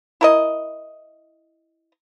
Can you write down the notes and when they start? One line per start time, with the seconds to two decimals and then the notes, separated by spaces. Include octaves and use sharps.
0.21 E4 A#4 D#5